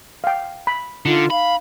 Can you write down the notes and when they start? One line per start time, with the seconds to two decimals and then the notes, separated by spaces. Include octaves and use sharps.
0.24 F5 G5
0.67 B5
1.05 D3 D#4 F4
1.30 F5 B5